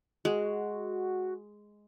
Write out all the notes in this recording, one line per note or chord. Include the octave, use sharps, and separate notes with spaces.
G#3 F#4